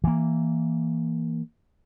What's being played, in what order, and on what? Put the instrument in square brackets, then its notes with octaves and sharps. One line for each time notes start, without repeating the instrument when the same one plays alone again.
[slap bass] E3 A#3